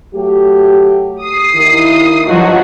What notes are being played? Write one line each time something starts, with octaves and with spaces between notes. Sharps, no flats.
F#3 A3 G4
D#6 C7
D#2 D#3 E4
G2 F3 F#3 F4 F#4 D#5